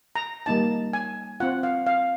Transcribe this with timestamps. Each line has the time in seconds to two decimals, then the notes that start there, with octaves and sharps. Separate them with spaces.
0.15 A#5
0.46 G3 A#3 D#4 A5
0.93 G#5
1.40 C4 F4 F#5
1.63 F5
1.87 F5